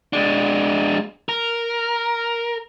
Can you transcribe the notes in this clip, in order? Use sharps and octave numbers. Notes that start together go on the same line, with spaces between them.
G#3 D4
A#4